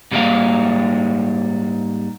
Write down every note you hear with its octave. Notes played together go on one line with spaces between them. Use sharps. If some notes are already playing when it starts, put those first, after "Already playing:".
G#2 B2 G3 G#3 A#3 F5